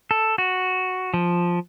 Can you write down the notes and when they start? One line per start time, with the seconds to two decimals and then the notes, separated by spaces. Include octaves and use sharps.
0.11 A4
0.38 F#4
1.14 F3